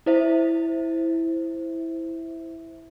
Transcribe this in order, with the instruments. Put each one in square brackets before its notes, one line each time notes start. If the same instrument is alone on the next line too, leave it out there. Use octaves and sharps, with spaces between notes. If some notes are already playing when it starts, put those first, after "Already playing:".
[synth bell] E4 C5 E5